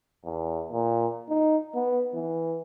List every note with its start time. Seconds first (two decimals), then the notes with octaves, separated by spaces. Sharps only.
0.25 E2
0.71 A#2
1.29 D#4
1.75 B3
2.14 E3